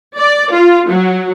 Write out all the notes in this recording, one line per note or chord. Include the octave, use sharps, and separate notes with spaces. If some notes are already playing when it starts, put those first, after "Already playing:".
D5
F4
F#3